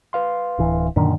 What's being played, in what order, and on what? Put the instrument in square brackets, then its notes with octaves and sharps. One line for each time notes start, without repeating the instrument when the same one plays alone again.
[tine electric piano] B4 F5 C6
[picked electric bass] D1 E3
[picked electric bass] F#2 A#2 D#3 [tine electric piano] D3 D4